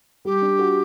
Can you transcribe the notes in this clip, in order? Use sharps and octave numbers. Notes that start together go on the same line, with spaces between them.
G3 G4
D4
F#4